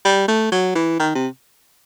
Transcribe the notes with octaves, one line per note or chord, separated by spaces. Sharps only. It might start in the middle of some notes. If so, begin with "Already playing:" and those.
G3
A3
F#3
E3
D#3
C3